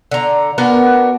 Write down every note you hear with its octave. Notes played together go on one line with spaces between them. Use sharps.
D3 A#5
B3 D4 F#4 A#4